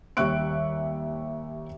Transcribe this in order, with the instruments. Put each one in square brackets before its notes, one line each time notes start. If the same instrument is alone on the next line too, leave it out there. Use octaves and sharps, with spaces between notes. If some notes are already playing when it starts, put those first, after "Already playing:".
[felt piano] D#2 G3 E5 C#6 F#6 D7